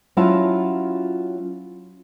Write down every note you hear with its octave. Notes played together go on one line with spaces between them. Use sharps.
F#3 C#4 E4 F4 A5